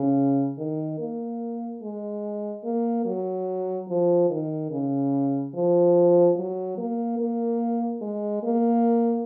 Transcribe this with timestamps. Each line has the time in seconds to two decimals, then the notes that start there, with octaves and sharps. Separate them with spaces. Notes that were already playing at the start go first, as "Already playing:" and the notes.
Already playing: C#3
0.58 D#3
0.99 A#3
1.82 G#3
2.64 A#3
3.05 F#3
3.88 F3
4.30 D#3
4.71 C#3
5.54 F3
6.36 F#3
6.77 A#3
7.19 A#3
8.01 G#3
8.43 A#3